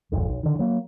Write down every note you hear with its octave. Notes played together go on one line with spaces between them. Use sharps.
D#1 G#1 F2
B1
D3 D#3
F#3 A#3